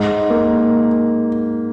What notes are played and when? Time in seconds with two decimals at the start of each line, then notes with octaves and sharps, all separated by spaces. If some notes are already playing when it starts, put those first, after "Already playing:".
Already playing: G#2
0.30 A#3